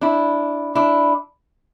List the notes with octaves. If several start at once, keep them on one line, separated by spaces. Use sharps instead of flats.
D4 E4
D4 E4